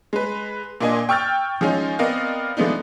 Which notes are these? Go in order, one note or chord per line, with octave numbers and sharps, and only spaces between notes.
G#3 B4
A#2 A#3 D4 D#5 G#5
G5 C#6 E6 F6 G6 A6
F3 G#3 C#4 D#4
B3 C4 A#4 D5 D#5 F5
F3 G#3 A3 B3 D4 D#4